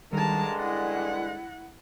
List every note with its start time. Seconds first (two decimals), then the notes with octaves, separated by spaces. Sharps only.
0.13 G2 D3 D#3 G3 G#3 A#4 A5
0.59 E4 F#5 F#6 A6 A#6